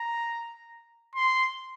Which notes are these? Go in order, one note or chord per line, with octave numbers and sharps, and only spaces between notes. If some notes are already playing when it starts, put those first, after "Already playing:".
Already playing: A#5
C6